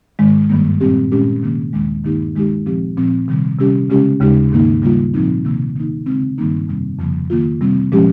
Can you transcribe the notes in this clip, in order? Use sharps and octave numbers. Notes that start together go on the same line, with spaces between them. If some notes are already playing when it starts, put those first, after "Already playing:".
G#2 D#3 G#3
G2 D#3 G3 A#3
A#2 G3 C4 G4
A#2 G#3 C#4 G4
C3 D#3 A#3
D#2 D#3 G#3
G2 D#3 A#3 D#4 G4
D#3 G#3 D#4 G4
A#2 F3 C4 G4
A#2 F3 C4
C3 D#3 G3
C3 G3 C#4 G4
C#3 G#3 C#4 G4
D#2 C#3 G#3 D#4 G4
G#2 D#3 A#3 D#4
C#3 G3 A#3 F4
A#2 F3 C4 D#4
C3 D#3 A#3
D#3 A#3 D#4
C#3 G#3 C4
G2 D#3 G3 A#3 D#4
F2 C3 G3 C4
F2 C#3 F3 A#3
D#3 A#3 F4
C3 G3 C4
A#2 F3 G#3 C#4 G4